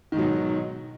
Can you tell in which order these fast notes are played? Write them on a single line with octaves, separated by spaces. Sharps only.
D#3 G#2 F#3 B2